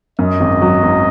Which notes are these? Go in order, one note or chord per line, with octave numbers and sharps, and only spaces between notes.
F#2 D#5
G#1
F#3
G#1